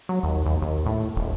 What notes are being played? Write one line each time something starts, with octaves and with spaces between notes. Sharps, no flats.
F#3
D#2
D#2
D#2
A2
D#1